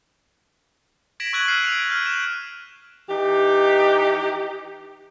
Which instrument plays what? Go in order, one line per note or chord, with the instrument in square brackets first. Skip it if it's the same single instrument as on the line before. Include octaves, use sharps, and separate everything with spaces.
[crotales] G#6 A#6 B6 D7 E7 F#7
C#6 E6 F#6 G#6 D#7 F#7
E6 F6 B6 C7 D#7 E7
D7 F7
F6 G6 C7
E7 F#7
[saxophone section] E3 D#4 G4